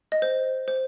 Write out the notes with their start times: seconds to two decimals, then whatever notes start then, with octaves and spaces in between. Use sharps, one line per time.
0.12 D#5
0.22 C5
0.68 C5